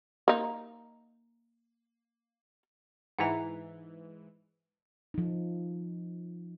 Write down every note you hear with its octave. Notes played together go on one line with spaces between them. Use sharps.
A#3 D#4
G#2 E3 F#5 A#5
F3 D#4